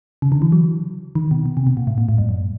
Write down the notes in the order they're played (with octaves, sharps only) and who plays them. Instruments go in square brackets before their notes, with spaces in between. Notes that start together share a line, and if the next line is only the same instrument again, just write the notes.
[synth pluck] C#3
D3
E3
F#3
D#3
B2
B2
C3
B2
A#2
A2
A#2
A2
G2
F#2